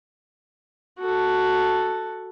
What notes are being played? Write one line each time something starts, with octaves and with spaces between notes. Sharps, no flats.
F#4 A4